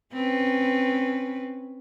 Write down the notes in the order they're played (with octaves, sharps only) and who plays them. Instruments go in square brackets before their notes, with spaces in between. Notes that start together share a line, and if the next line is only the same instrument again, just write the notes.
[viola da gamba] C4 C#4 B4